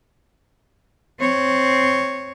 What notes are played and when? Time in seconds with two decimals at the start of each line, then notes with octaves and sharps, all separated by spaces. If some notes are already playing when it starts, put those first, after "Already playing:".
1.19 C4 C#5